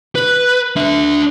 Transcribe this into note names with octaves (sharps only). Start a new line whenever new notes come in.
B4
D4 E5